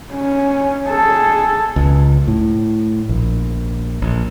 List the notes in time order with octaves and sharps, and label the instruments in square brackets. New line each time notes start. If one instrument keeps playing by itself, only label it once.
[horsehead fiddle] C#4
G#4 A4
[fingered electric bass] C#2
A2
A#1
A#1